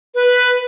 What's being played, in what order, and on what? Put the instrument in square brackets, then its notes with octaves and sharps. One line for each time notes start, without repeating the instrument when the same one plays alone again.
[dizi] B4